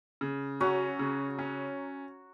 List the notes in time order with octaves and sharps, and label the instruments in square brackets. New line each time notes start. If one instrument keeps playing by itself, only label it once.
[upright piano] C#3
[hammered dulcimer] F#3 F#4 [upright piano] C#4
[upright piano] C#3
C#4